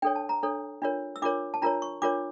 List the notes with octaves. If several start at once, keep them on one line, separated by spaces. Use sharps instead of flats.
D4 A4 C#5 G5
A5
A#5
D4 A4 C#5
D4 F4 A#4 C#5
E6
D4 F4 A#4 C#5 D6
A5
D4 F4 A#4 C#5 A#5
C#6
D4 F4 A#4 C#5 D6